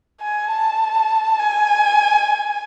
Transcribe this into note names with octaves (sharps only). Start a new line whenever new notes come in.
G#5
A5
G#5